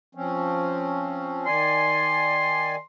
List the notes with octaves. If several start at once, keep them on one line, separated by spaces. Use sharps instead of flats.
F3 C4 C#4
D#3 D5 G#5 C6